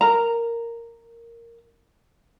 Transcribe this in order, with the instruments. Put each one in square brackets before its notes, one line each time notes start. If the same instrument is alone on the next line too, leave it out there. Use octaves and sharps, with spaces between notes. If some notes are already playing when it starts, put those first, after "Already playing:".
[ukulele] A#4 A#5